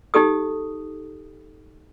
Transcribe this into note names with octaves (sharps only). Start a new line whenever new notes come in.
D#4 G4 A4 D#6